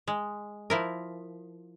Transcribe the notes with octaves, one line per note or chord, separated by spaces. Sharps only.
G#3
F3 E4 A#4